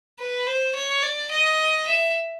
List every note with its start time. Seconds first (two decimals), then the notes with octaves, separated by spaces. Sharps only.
0.19 B4
0.47 C5
0.75 C#5
1.03 D5
1.31 D#5
1.87 E5